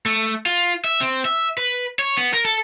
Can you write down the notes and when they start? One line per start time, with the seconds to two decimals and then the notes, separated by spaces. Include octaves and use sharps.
0.06 A3
0.46 F4
0.84 E5
1.01 C4
1.25 E5
1.58 B4
1.99 C#5
2.17 B3
2.34 A#4
2.45 A4